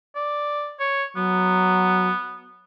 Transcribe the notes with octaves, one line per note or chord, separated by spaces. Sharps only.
D5
C#5
F#3 B3